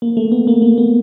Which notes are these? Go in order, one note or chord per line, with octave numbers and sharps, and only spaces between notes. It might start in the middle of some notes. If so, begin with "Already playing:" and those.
A#3
A3
B3
A#3
A#3
B3